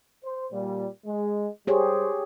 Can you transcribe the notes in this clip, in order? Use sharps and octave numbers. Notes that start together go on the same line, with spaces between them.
C5
A#2 G3
G#3
G3 G4 G#4 C5 C#5